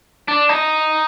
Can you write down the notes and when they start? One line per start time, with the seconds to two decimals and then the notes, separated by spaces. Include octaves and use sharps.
0.28 D4
0.49 D#4